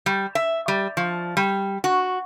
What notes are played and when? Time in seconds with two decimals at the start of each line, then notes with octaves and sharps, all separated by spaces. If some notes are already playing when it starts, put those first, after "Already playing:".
0.06 G3
0.35 E5
0.68 G3
0.97 F3
1.37 G3
1.84 F#4